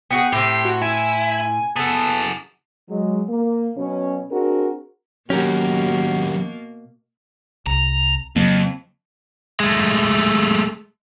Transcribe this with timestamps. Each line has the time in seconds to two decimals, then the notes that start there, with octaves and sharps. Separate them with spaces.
0.11 B3 F#4 G#4 G5
0.32 A2 C4 G4 C7
0.65 F#4
0.82 E4 G#5
1.76 B3 F#4 G#4 A4 A5
2.89 F#3 G#3
3.29 A#3
3.76 B2 F#3 C#4
4.31 C4 D4 F#4 G#4 A#4
5.30 D#2 B2 F#3 A#3 C#4 F#4 G4 A#4
7.67 C2 A#5
8.36 F2 C#3 F#3 A#3
9.60 G#3 A3